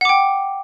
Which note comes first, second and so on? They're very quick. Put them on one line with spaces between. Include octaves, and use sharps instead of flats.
F#5 D6 G5